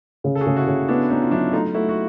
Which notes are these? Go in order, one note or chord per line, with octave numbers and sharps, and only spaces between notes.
C#3
A4
F#4 G#4
C#3
E4 F#4
C#3
B3 D4 E4
B3 C#4 D#4
F4
F#3 D4 E4
A3 D#4 F4
A3 E4 F#4
F#4